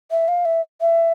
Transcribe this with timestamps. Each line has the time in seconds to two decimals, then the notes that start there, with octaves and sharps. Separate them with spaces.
0.11 E5
0.28 F5
0.45 E5
0.81 E5